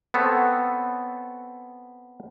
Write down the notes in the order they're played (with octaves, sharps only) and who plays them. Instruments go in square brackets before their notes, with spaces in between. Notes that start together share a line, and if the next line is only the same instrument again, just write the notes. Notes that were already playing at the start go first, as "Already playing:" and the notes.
[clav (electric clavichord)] B3 C4 A4 C#5